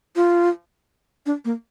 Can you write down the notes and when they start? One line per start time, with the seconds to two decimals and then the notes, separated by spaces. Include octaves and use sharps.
0.16 F4
1.26 D4
1.45 A#3